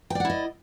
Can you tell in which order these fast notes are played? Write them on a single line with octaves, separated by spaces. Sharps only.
G5 D5 F#5 E4 D#5